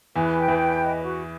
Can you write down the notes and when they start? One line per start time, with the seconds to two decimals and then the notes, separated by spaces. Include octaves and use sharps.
0.15 E2 E3 B4
0.37 G5
0.48 E2 E3
0.60 B4
0.81 D#5
1.03 F#4